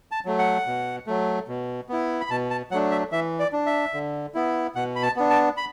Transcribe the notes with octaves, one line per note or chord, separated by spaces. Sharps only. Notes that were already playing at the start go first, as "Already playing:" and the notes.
A5
F#3 A3
F#5
B2
F#3 A3
B2
B3 E4
B5
B2 A5
A5
F#3 A3 D4 F#5
E5
E3 E5
D5
D4
E5
D3
B3 E4
B2 F#5
B5
A5
B3 D4
A5
B5